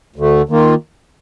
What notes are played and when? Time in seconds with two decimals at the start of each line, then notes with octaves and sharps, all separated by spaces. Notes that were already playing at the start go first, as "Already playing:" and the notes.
0.16 D2 D3 A3
0.49 D#3 A#3 F4